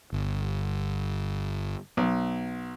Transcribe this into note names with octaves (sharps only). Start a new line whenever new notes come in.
G1
B1